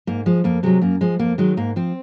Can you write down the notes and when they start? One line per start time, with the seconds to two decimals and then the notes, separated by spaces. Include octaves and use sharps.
0.07 G#2 A#3
0.26 F3 G#3
0.44 F2 A#3
0.63 C3 F#3 G#3
0.81 F#2 A#3
1.01 F3 G#3
1.19 F2 A#3
1.38 D#3 F#3 G#3
1.57 G#2 A#3
1.76 F3 C4